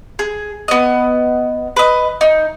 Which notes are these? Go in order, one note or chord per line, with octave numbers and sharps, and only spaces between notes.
G#4
B3 D#5
B4 D#5
D#4